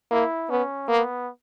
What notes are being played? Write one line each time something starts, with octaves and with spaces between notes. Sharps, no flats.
A#3 E4
B3 C#4
A#3 B3